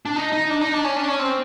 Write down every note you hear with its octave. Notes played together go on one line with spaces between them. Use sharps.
D4
D#4
D#4
D4
D#4
D4
C#4
D4
C#4
C4